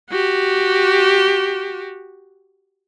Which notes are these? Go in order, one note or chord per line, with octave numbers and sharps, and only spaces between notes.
F#4 G4